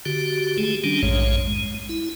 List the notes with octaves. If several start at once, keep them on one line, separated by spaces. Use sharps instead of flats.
D3 F#4 G4
G#3 A3 G4 G#4
D#3 G3 C#4 D4
A#1 F2 G#2 G#3 C#5
G#3
E4